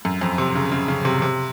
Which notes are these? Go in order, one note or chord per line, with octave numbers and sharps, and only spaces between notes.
F#2
F2
C3
C#3
C#3
C#3
C3
C3